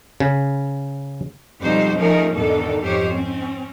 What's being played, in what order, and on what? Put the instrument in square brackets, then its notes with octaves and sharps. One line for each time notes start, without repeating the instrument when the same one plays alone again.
[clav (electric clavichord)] C#3
[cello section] F2 B2 G3 G#3 D#4 C5
F3 A3 C#4 D#4 G#4 A#4
E2 G#2 B2 D3 D#3 A4
F2 G#2 G4 C5 C#5
C4 C#4